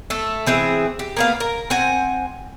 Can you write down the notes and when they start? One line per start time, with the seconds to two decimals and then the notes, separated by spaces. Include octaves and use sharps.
0.10 A3 A4
0.46 E3 C4 G#4 E5
0.99 G4
1.17 A#3 B3 F5
1.40 A#4
1.70 C4 F#5 G#5